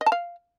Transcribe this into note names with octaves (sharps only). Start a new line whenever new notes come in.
D#5
A5
F5